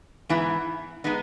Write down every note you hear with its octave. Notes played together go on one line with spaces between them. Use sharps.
G#2 E3 B3 E4
G#3 B3 D#4